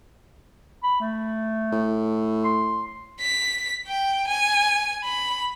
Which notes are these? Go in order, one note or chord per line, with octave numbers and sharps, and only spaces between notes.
B5
A3
A2
C6
B6
G5
G#5
B5